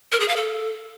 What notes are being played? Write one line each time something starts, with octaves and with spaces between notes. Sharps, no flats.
A#4
G#4
F5
A4